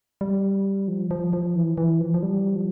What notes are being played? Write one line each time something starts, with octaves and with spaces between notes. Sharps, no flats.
G3
F3
F3
F3
E3
E3
F3
F3
G3
F3